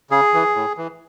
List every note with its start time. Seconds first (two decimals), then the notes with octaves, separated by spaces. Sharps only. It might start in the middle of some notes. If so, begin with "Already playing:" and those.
0.11 C#3 G#4
0.34 E3
0.55 A2
0.77 E3